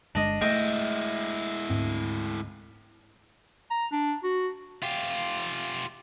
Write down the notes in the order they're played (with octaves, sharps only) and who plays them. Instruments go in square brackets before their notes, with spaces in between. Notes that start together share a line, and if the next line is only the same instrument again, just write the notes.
[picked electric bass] G1 G#3 [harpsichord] D4 D#5
[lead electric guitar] G#3 E4 [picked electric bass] A3 [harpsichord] D#5 G5
[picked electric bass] D2 G#2 C4
[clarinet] A#5
D4
F#4
[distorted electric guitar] F4 G4